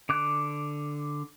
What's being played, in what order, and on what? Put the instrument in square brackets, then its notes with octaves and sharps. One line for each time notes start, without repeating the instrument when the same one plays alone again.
[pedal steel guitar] D3 D6 F#6